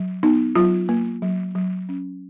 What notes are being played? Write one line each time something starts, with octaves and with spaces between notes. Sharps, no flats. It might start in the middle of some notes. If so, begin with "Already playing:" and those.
Already playing: F#3
B3 D#4
F#3 F4
A#3
F#3
F#3
C#4